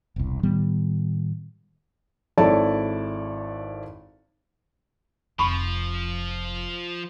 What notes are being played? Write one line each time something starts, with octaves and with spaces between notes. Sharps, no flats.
E1 C2
A2 D#3 G3 B3
G#1 E4 A4 C#5 D5 A5
F1 F3 D#4 B5 C#6